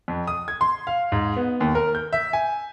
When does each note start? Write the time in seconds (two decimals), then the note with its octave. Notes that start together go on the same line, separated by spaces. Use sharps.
0.08 F2
0.27 D#6
0.48 G#6
0.61 C6
0.87 F5
1.12 G#2
1.36 B3
1.60 D#2
1.75 A#4
1.95 G6
2.13 E5
2.33 G#5